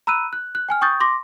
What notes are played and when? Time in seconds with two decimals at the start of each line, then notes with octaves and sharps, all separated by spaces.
0.07 A#5 B5 E6 F#6 D#7
0.33 F#6
0.55 F#6
0.69 G5 G#5 F6
0.81 G5 C#6 D#6 G6 A6
1.00 C6 D6 A#6